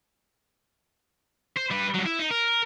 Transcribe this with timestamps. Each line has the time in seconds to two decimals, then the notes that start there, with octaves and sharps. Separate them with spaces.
1.56 C5
1.70 G3 B4
1.94 G2 F#3
2.06 E4
2.19 D#4
2.31 A#4